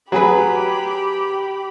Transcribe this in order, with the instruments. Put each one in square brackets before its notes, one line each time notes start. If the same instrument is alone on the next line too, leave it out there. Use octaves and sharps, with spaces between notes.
[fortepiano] F#3 G#4 B4 [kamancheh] G4 B5